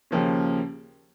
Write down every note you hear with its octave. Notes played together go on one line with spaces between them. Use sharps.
D#2 C#3 F3 A#3 C#4